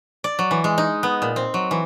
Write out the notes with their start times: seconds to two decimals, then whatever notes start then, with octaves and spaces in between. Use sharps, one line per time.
0.24 D5
0.39 F#3
0.51 E3
0.64 G#3
0.78 D#4
1.03 B3
1.22 A#2
1.36 C4
1.54 F#3
1.71 E3